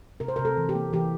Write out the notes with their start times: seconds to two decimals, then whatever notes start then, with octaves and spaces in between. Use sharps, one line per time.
0.20 C3 A#4
0.28 C5
0.36 A#4
0.39 C3
0.45 A4
0.57 E3
0.69 G4
0.75 A#3
0.93 E3 G4